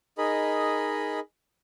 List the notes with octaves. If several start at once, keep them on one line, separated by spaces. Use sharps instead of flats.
D#4 G#4 A#4 D#5 B5